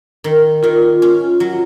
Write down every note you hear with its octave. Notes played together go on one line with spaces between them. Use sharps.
D#3
D#3 F4
C#4
F#3